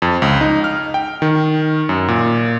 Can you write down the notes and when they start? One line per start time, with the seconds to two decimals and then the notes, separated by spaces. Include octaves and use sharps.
0.02 F2
0.22 C#2
0.41 D#4
0.64 F6
0.94 G5
1.22 D#3
1.89 F#2
2.08 A#2